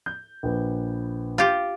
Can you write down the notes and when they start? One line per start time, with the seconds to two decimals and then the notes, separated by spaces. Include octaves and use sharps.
0.06 G6
0.43 A#1 B4
1.38 F4 G4